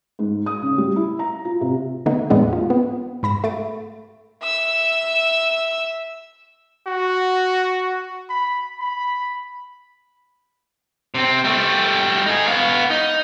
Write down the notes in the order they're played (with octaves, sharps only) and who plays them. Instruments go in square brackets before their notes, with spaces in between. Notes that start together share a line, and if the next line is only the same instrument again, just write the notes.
[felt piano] G#2
D#6
C#3
G3
E4
A#5
F4
C3
[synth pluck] D3 A3 B3 D#4
E2 A2 E3 G#3 B3 D4
F4
B3
G#2 B5 A#6 E7
A3 A6 D7
[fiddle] E5 E6
[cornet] F#4
B5
B5
[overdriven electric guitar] C3 C4
G3 A3
D#4 G#4
B3 F5
D#4